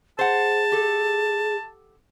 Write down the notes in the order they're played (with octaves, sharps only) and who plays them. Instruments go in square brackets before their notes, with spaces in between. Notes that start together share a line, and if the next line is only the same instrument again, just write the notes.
[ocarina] G#4 [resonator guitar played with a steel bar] C5 F#5 [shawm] A5
[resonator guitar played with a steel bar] G4 A4